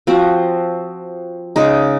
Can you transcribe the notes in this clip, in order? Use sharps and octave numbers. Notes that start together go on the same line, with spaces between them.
F3 C4 F#4
C#3 G#3 D#4